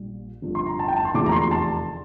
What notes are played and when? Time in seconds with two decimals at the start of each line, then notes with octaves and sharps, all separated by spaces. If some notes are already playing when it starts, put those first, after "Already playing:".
Already playing: A#1 A#2 G3
0.42 G1 G2 F3
0.55 C6
0.67 A#5
0.79 A5
0.88 G5
0.96 A5
1.05 C6
1.14 F1 E2 D3 F3 D6
1.26 A#5
1.32 C6
1.51 A5